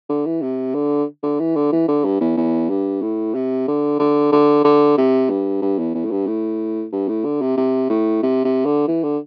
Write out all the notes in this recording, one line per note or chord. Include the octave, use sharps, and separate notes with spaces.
D3
E3
C3
D3
D3
E3
D3
E3
D3
G2
E2
E2
G2
A2
C3
D3
D3
D3
D3
C3
G2
G2
E2
E2
A2
G2
A2
G2
A2
D3
C3
C3
A2
C3
C3
D3
E3
D3